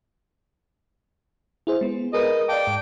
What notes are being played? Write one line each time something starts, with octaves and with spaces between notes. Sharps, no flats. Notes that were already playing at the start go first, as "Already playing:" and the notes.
E4 G#4 C5
G#3 B3
G#4 A#4 B4 D#5
D5 F5 G5 A5 D6
G#2